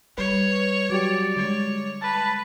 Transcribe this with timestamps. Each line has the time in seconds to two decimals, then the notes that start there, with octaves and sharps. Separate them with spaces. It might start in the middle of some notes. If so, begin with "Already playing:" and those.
0.18 G3 B4 C#5
0.90 F#3 F#4 G4 D5
1.37 D3 G#3 C#5
2.02 B4 A5